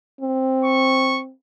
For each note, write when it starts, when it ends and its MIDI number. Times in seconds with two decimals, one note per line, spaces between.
0.21 1.31 60
0.65 1.21 85